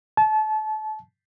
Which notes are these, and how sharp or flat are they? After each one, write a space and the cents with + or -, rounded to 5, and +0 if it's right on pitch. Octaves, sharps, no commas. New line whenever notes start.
A5 -30